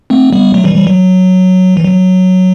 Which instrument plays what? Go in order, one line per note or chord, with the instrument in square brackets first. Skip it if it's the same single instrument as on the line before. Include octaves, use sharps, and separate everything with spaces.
[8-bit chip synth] A3 C4
G3 B3
F#3 A3
E3 G3
E3 G3
F#3
E3
F#3